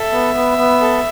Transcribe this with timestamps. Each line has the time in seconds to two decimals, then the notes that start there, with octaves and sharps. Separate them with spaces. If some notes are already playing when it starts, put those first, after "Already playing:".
Already playing: A4 E5
0.12 B3
0.35 B3
0.58 B3
0.81 A4